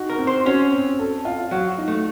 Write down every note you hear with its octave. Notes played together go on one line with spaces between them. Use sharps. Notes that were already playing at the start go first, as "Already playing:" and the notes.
Already playing: D#4 F#4
A#4
C4
C5
C#4 F#4
C4
A4
F4
F#3 F#4
D#4
A3